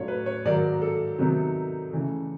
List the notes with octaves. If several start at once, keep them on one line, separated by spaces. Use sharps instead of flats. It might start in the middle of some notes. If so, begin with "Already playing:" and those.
Already playing: A2 F#3 A3 D4 F4 C#5
B4
C#5
G#2 D#3 F#3 A#3 D5
A4
C3 D#3 F#3 B3 D#4
C#3 E3 A3